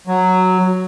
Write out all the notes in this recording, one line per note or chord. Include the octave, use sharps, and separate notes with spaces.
F#3